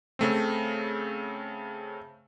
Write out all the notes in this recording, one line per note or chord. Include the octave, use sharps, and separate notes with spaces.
C#3 A3 C4